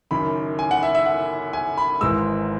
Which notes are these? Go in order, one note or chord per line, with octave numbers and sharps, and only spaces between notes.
F#1 F#2 D#3 B5
G#5
F#5
E5
E5
F#5
G#5
B5
G#1 G#2 E3 G#3 D#4 E6